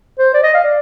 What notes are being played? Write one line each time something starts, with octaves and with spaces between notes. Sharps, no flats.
C5
D5
D#5
F5
D5